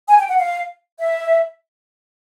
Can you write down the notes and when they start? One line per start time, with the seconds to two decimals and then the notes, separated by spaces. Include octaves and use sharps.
0.08 G#5
0.19 G5
0.29 F#5
0.39 F5
0.99 E5